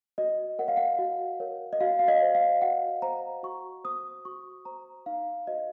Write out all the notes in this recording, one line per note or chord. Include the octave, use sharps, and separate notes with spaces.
F#4 D#5
A#4 C#5 F#5
F5
F#5
F#4
A#4 C#5
D#5
F#4 F5
F5
D#5
C5
F5
F#4 F#5
C5 A#5
F#4 C#6
C5 D#6
F#4 C#6
C5 A#5
D#4 F5
F#4 C5 D#5